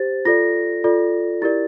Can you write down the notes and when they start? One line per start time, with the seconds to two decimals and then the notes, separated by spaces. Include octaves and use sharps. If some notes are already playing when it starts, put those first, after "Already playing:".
Already playing: G4 C5 A6
0.25 F4 A4 D5 A#6
0.84 F4 A4 D5
1.42 E4 G4 A#4 D5 A6